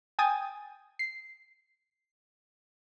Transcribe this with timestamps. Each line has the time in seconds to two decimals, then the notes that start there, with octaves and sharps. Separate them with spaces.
0.19 G5 G#5 D#6 A6
0.99 C7